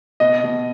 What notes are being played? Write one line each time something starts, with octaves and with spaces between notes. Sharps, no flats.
B2 D#5
B2